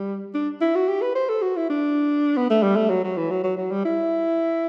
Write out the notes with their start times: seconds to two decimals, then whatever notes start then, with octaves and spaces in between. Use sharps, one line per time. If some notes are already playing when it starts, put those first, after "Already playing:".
Already playing: G3
0.35 D4
0.61 E4
0.75 F#4
0.89 G4
1.02 B4
1.15 C5
1.29 A4
1.42 F#4
1.56 E4
1.70 D4
2.37 B3
2.50 A3
2.63 G3
2.76 A3
2.90 F#3
3.04 F#3
3.17 E3
3.31 F#3
3.44 F#3
3.57 F#3
3.71 G3
3.85 E4